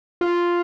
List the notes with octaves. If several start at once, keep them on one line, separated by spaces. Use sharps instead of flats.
F4